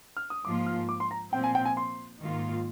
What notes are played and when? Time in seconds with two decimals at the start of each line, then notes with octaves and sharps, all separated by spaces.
0.17 F6
0.30 D#6
0.45 G#2 F3 A#3 F4 D6
0.67 F6
0.89 D6
1.00 C6
1.11 A#5
1.32 A#2 F3 C4 G5
1.44 G#5
1.55 G5
1.65 G#5
1.77 C6
2.22 G#2 D#3 A#3 F4